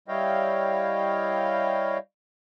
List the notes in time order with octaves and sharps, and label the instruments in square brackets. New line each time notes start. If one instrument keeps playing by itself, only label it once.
[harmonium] G3 E4 C#5 D#5 F5 G5